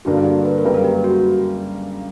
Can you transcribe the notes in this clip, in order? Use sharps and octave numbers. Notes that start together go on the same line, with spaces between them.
G2 D3 A#3 D4 F#4
G4
B4
A#4
F#2 C#3 G3 A#3 B4
A#4
G4
F#4